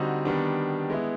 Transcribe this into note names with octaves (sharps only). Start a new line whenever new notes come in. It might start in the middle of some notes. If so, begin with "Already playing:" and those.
Already playing: D3 G3 C4 D#4 F#4
D#3 G3 B3 D4
G#3 B3 E4